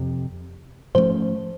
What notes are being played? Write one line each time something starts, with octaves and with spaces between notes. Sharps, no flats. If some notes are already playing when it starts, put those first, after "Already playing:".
Already playing: F2 C3
G#2 F3 A3 C#4 C5